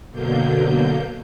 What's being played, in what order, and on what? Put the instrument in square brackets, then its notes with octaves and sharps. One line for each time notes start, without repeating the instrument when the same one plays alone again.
[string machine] F#2 B2 D3 F#3 A#3 G6